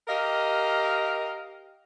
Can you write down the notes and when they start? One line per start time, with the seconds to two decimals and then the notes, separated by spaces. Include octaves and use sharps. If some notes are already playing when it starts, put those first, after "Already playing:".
0.08 G4 A#4 D#5 F5